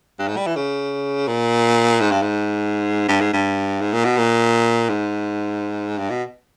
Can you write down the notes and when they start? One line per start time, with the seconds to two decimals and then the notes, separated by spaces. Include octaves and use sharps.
0.19 G2
0.28 G#2
0.37 G3
0.47 E3
0.56 C#3
1.27 A#2
2.01 G#2
2.11 G2
2.22 G#2
3.08 G2
3.21 G#2
3.33 G2
3.81 G#2
3.93 A#2
4.05 B2
4.17 A#2
4.89 G#2
5.98 G2
6.10 B2